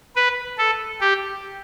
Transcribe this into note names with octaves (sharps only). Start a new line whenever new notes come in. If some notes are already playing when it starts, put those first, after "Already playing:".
B4
A4
G4